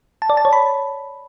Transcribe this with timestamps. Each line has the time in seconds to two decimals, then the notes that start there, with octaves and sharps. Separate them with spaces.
0.22 A5
0.30 D5
0.37 A5
0.45 C#5
0.53 B5